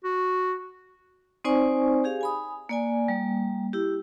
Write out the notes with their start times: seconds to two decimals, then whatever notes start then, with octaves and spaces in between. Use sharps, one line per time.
0.04 F#4
1.44 C4 D#4 C5 D5 G#5 C#6
2.04 G4 G#4 F5
2.21 G#5 B5 D#6
2.69 A#3 D5 G#5
3.08 G3 A#3
3.73 E4 G4